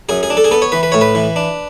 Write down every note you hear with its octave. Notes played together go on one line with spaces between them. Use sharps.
F#2 G#4
G#4
D4
A4
G#4
B3 A4
C#5
E3 B4
B4
A2 C#5
B4
E3
D4